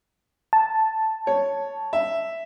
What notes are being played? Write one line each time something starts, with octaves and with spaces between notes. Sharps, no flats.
A5
C#5
E5